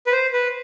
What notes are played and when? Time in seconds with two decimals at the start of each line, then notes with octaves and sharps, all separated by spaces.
0.07 B4
0.12 C5
0.33 B4